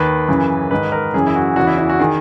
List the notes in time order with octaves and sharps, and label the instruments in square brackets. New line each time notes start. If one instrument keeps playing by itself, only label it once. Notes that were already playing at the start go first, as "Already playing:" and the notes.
Already playing: [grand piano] D#2 D#3 B4
F#2 C#3 E3
G#2 D#3 B4
A#4
F#2 C#3 E3 G#4
E4
F#4
E2 F#4
C#3 E3
E4
E4
F#4
D#3 G#4